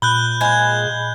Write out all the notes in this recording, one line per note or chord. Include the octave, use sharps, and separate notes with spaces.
A#2 B5 F#6 G6 G7
G#3 C4 F4 G6 G#6